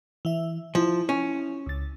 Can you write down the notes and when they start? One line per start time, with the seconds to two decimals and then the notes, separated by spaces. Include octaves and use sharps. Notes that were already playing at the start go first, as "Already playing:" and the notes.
0.25 E3 E5
0.75 F3 E4
1.09 C#4
1.66 C#2 A6